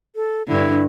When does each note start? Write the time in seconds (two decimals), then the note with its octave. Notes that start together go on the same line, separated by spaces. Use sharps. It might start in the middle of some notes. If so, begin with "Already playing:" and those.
0.15 A4
0.48 G2 D3 E4